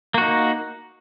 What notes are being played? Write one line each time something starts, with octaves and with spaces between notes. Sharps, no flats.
A#3 D#4 F#4